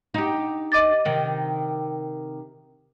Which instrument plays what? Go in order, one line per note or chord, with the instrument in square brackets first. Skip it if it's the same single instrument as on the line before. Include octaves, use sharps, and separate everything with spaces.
[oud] D#4 G4
[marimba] D#5 D6 A6
[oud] C3 D#3